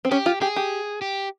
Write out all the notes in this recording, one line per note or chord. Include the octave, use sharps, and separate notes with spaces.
C4
C#4 G4
F4
G4 G#4
G4
G4